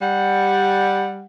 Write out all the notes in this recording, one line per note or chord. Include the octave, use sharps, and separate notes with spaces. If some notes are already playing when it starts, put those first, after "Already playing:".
G3 F#5